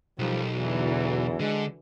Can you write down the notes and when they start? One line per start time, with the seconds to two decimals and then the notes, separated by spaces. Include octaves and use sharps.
0.19 B1 D#3 F3 G3
0.55 E2 D3 E3 F#3
1.40 D3 G#3